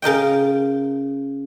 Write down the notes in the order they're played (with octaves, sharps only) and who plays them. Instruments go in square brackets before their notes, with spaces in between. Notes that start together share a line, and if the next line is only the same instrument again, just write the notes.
[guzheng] C#3 A#4 D#5 G5